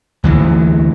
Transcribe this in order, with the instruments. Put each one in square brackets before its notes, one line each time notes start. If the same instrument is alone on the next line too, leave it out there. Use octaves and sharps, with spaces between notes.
[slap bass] D2 E3 F#3